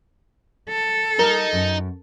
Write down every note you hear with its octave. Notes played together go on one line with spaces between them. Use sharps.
A4
G3 D#4 A#4
F#2 C#4